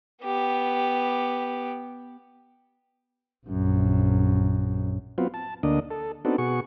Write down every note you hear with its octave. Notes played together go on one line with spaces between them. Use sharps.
B3 G4
A#1 F#2
F#3 B3 C4 F4
A5
D2 D3 A#3 D4 D#5
A4
B3 C4 D4 D#4 F#4 A4
B2 F#4 G#4 C#6